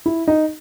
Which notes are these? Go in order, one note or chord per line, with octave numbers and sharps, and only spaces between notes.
E4
D#4